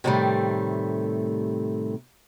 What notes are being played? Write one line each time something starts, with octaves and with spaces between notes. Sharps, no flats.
A2 C3 D#3 E3 G3 A3